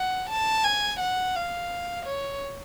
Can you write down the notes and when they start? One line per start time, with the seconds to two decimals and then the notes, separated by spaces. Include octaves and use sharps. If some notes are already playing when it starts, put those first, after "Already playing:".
Already playing: F#5
0.29 A5
0.64 G#5
1.00 F#5
1.35 F5
2.06 C#5